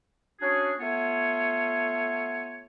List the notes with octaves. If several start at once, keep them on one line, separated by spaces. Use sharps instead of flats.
C#4 D4 F#4 G#4
A3 B3 F4 C#5 G#5